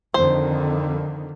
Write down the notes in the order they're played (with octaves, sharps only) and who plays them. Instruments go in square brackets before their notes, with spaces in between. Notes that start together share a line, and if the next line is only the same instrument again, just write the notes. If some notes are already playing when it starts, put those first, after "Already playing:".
[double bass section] F2 D3 D#3 [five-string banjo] C5